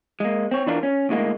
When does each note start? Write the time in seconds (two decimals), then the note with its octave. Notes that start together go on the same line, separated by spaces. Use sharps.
0.20 G#3 A#3
0.51 C4 C#5
0.67 E3 D4 E4 F4 A#4
0.83 C#4
1.09 D2 A2 G#3 A#3